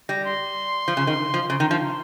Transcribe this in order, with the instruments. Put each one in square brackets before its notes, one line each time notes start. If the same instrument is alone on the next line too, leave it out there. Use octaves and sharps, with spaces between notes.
[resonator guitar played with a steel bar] G3 [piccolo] A#6
[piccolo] C6
[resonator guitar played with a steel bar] F3
C#3
D#3
F3
[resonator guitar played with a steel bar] C#3 [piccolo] C6
[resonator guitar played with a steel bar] D#3
F3